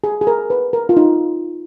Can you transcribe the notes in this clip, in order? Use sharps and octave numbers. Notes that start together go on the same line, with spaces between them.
G#4
G#4
A#4
B4
A#4
F4
D#4